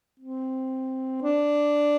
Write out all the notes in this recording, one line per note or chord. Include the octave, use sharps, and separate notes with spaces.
C4
D4